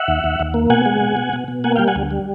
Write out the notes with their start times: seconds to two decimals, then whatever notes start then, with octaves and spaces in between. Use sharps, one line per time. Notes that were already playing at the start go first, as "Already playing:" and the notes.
Already playing: E5 F#5
0.08 D#2
0.24 D#2
0.40 D#2
0.54 A#3
0.70 B2 F#5 G#5
0.86 G#3
1.01 B2
1.17 B2
1.33 B2
1.48 B2
1.64 A#3 F#5 G#5
1.76 G3 F5 G5
1.88 F#5 G#5
1.96 D2
2.11 G3